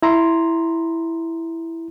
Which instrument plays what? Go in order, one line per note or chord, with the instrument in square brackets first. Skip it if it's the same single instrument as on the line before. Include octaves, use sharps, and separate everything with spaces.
[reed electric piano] E4 A#5 C6